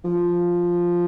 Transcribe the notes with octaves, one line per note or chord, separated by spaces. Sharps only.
F3